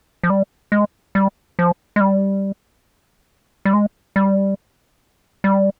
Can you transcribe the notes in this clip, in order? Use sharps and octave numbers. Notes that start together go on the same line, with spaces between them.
F3
G3
G#3
G3
F3
G#3
G3
G3
G#3
G3
G3